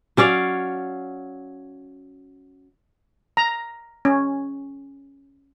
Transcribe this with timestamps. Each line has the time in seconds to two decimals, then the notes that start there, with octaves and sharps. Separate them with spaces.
0.17 F#3 C#4 D5 F5
3.37 A#5
4.05 C#4